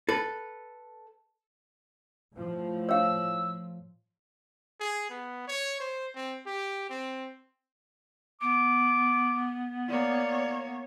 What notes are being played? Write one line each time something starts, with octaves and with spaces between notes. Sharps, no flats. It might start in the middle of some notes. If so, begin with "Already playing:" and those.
A4 B4
A2 F3
C#5 F5 E6
G#4
B3
C#5
C5
C4
G4
C4
B3 D6
A#3 C#5 D5